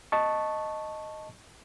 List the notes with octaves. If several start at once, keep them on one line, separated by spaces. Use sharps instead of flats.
D#5 A5 C#6